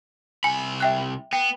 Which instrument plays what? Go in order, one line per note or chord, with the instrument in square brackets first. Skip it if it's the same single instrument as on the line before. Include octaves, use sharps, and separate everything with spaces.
[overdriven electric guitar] C2 B5 [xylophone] G#5
[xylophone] E5 G5 F#6
[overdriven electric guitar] B3 [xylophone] G5